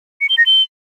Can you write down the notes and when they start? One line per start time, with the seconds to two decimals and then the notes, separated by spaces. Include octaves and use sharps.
0.21 C#7
0.29 G7
0.38 A#6
0.46 G7